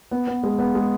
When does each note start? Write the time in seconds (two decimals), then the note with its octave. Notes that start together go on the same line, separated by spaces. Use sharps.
0.11 B3
0.27 B3
0.43 G#3
0.59 B3
0.75 G#3